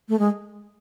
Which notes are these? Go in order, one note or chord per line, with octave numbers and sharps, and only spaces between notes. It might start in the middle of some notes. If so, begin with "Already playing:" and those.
A3
G#3